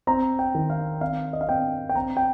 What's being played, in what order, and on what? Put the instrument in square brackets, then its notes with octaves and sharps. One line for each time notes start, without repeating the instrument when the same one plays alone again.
[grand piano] C4 A#5
G5
D#3
F5
C4 F5
D#5
F5
C4 G5
G5
C4 A#5
G5